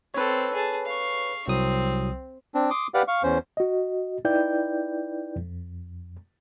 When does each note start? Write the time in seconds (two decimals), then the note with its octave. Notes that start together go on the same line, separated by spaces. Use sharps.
0.14 C4 A4 B4 C#5
0.53 G#4 A5
0.86 F5 C#6
1.48 C2 F#3 C4 D#6
2.55 C4 D4
2.70 C6 D6 D#6
2.94 G4 B4 D5 F5 F#5
3.08 F5 C#6
3.23 E2 C#4 C5
3.57 F#4 D#5
4.25 D#4 E4 B4 D5 G5 G6
5.36 F2